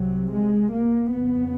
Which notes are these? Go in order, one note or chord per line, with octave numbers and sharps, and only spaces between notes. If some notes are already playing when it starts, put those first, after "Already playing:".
Already playing: C2 C3 F#3
G#3
A#3
F2 C#3 B3